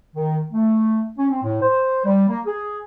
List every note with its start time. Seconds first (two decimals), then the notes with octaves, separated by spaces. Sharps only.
0.16 D#3
0.53 A3
1.17 C#4
1.30 C4
1.43 A2
1.61 C5
2.05 G3
2.29 A#3
2.46 G#4